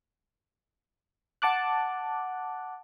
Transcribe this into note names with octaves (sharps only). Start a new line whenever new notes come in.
F#5 A5 D6 F#6